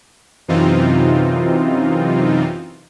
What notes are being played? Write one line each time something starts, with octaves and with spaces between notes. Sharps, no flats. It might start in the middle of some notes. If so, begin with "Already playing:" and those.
F#2 C3 E3 C4 D#4 F4